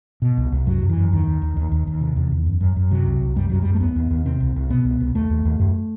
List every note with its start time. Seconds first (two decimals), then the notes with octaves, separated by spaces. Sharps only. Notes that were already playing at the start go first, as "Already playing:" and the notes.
0.22 B2
0.37 C2
0.52 C2
0.67 F#2 F#3
0.82 F#2
0.89 E3
0.97 F#2
1.12 D#2 D#3
1.27 D#2
1.42 D#2
1.57 D#2
1.72 D#2
1.87 D#2
2.01 C3
2.16 E2
2.32 E2
2.46 F#2
2.61 F#2
2.76 F#2
2.91 C3 F#3
3.06 C2
3.21 C2
3.36 F#2 G3
3.50 F#2 F#3
3.62 F#2 G3
3.74 A3
3.81 D#2 B3
3.96 D#2
4.11 D#2
4.25 C3 C4
4.40 C2
4.56 C2
4.70 B2 B3
4.85 C2
5.00 C2
5.15 D#2 A3
5.30 D#2
5.45 D#2
5.59 F#2